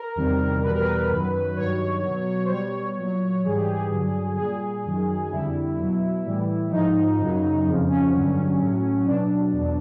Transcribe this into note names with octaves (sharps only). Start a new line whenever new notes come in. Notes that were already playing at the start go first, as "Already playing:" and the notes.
Already playing: A#4
E2 C3 D#3 G3
E2 B2 G3 B4
A#4
B4
F#2 D#3 F#3
G2 D#3 F#3 C#5
B2 F#3
C5
B2 G3 C#5
A#2 F#3
G#2 E3 G3 G#4
G4
G#4
G2 D3 F#3
A#2 G3 G#4
F#2 D#3 F#3
F2 D3 G3 E4
B2 F#3
A2 E3 G3
G#2 F3 D#4
F#2 C#3 F#3
F2 C#3 F3
C#4
G2 D3 F#3
A2 F#3
B2 F#3 D4
E2 B2 F#3